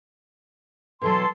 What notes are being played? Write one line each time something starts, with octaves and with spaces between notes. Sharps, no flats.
B2 E3 F#3 A4 C6